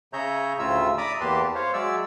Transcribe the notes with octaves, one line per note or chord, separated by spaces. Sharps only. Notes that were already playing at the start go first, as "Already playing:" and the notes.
C#3 G#4 C#5 E5 A#5 G6
D2 A2 C#3 F4 E5 E6
D5 E5 A#5 B5 D6 D#6
E2 A#3 G4 B4 A5 C6
C5 C#5 F5
F#3 G#3 D5 E5 E6